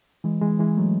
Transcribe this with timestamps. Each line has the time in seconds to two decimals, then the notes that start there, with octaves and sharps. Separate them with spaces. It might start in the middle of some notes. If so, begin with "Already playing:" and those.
0.24 E3 G#3
0.41 E3 G#3
0.59 E3 G#3
0.77 F#3 A3